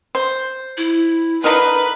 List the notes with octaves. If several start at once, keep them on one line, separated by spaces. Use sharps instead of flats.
C5
E4
D3 D#4 A#4 B4